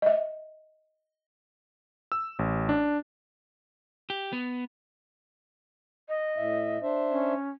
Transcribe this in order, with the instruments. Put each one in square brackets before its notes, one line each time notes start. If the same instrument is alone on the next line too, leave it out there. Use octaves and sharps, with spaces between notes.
[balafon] D#5 E5
[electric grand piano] E6
A1
D4
[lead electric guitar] G4
B3
[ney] D#5
[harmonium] A2 E5
D4 C5 E5
[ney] C#4